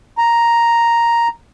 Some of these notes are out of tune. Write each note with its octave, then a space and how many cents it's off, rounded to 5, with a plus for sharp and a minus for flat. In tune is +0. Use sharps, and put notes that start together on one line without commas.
A#5 +0